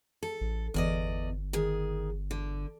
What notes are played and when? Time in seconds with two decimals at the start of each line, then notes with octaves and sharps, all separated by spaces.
0.23 A4
0.41 A1
0.74 G1 E2 D5 D#5
1.53 D#3 G#4
2.31 D3